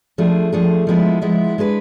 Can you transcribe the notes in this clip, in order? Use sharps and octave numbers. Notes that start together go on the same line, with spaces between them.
F3 A3 D4 G#4
F3 A3 D4 G#4
F3 G#3 B3 E4
F3 G#3 B3 E4
G#3 D4 G#4 B4